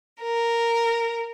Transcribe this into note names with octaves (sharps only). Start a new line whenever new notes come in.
A#4